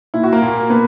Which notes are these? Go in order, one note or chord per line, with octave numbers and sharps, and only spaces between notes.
A#2 E4
F#4
A#3 A#4
A#2
A#2 B3 B4